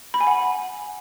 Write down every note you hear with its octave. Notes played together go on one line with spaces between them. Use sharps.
B5
G#5
F#5